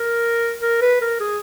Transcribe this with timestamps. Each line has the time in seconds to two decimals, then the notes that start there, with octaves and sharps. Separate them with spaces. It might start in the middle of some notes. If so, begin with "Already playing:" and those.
Already playing: A#4
0.62 A#4
0.82 B4
1.01 A#4
1.20 G#4